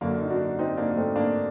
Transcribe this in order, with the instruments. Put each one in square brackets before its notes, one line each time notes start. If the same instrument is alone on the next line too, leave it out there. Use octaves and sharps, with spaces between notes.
[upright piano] F#2 D3 A#3 D4
D#4
D4 F#4
C4 D#4
A#3 D4
A#3
A3 C4
A#3 D4